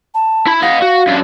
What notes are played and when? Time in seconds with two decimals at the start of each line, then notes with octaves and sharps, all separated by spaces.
0.14 A5
0.46 E4 B5
0.62 D#5 F5 F#5
0.82 F#4
1.07 F#2 D4